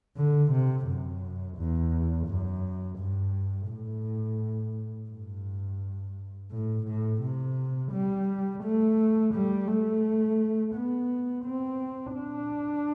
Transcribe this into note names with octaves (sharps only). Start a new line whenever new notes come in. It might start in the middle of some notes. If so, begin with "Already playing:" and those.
D3
C3
F#2
E2
F#2
G2
A2
G2
A2
A2
C3
G3
A3
G3
A3
B3
C4
D4